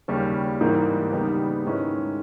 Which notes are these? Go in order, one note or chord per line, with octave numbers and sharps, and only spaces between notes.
D#2 C#3 G3 C#4
G#2 E3 G3 A#3 D#4
D#2 C#3 G3 B3 D#4
G#2 D#3 G#3 C#4 E4